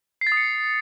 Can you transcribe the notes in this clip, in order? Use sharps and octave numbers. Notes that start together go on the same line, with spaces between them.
C7
A6
D#6
C#7